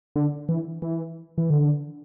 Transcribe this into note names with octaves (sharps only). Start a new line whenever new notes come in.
D3
E3
E3
E3
D3